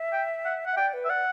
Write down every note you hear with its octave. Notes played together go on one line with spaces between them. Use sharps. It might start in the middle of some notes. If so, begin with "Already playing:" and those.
Already playing: E5
G5
F#5
F#5
E5
D5 G5
B4
E5
D5 F#5